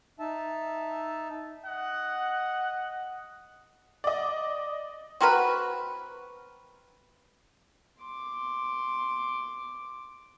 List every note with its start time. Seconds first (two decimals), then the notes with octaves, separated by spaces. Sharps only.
0.20 D#4 E5 A5
1.65 D#5 F#5
4.04 D5 D#5
5.21 C4 F#4 A#4 B4
8.00 C6 D6